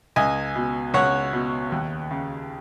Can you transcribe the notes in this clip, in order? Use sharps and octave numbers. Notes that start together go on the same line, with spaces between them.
C#2 D#5 G#5
B2
C#2 C#5 F#5
B2
D#2
C#3